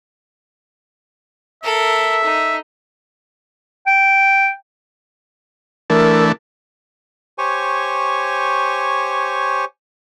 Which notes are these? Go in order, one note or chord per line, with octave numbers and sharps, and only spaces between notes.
A4 A#4 E5
D#4
G5
E3 A3 D4 A#4
G4 C5 C#5 G#5 C#6